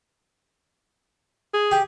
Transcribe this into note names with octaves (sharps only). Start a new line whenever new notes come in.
G#4
G4